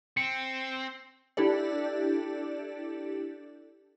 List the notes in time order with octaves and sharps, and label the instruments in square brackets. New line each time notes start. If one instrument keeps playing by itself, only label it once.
[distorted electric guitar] C4 [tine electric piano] C#7
[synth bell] D4 E4 G4 A4 D5